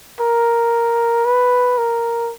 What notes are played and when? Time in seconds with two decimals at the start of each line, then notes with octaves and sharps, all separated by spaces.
0.20 A#4
1.25 B4
1.78 A#4